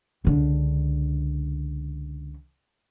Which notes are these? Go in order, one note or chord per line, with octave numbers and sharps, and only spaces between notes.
C#2 D3